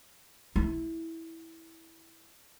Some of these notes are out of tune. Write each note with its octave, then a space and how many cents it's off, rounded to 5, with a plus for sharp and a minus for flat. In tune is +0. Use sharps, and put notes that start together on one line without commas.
E4 -10